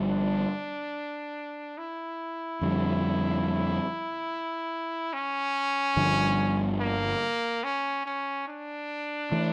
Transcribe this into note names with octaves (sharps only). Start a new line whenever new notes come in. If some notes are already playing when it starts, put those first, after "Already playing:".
Already playing: G1 G2 F3
D4
E4
F2 D3 G3
C#4
G1 G2 D3 F3
A#3
C#4
C#4
D4
E3 A3